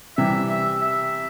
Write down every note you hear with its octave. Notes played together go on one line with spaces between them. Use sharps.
C3 E3 G3 E5
E5
E5